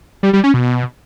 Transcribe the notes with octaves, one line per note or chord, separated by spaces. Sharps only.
G3
G3
C#4
B2